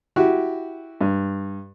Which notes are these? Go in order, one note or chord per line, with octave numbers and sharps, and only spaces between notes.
E4 F#4 G4
G2